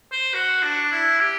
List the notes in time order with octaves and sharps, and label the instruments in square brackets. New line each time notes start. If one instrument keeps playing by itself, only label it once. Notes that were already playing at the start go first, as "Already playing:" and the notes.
[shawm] C5
F#4
D4
E4
G4